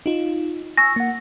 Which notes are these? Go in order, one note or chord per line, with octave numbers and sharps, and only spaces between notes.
D#4 F4
G#5 C#6 E6 A#6
A#3 F#5